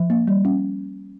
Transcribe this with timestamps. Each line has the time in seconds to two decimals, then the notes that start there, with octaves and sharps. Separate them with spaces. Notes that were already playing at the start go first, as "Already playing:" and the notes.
Already playing: F3
0.10 A#3
0.27 G3
0.45 C#4